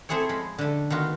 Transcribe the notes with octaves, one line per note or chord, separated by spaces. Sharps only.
A3 C4 E4 G#4 A4 C#5
F3 G#3 B5
D3 A3
D#3 B3 F4 F#4